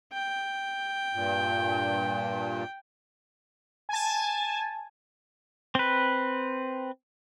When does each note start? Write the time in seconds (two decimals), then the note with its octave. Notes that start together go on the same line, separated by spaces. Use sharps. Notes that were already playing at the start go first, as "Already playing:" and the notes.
0.13 G5
1.14 G2 A#2
3.89 G#5 A5
5.75 C4 B4